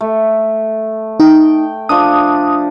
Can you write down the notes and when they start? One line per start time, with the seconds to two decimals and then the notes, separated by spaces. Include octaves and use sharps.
0.01 A3
1.20 D#4 G5
1.89 F3 D4 D#6